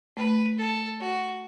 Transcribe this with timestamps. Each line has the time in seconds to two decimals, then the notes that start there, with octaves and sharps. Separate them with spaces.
0.16 A3 B4
0.58 A4
1.00 F#4